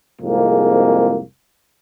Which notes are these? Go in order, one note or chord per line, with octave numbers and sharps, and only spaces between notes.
C2 F2 G#2 G#3 A#3